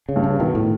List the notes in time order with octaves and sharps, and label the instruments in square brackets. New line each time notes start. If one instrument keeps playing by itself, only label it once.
[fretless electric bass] C#3
[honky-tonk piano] G2
[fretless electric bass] C#3
[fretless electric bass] B2 [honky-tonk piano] D#3
[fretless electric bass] A2